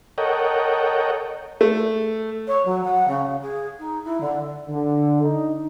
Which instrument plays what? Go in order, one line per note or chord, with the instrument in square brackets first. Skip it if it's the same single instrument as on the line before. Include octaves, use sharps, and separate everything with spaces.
[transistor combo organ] A4 A#4 C#5 D#5 F#5 G5
[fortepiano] A3
[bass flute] C#5
F#3
F#5
C#3
G#4
D#4
E4
D3
[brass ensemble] D3
D#4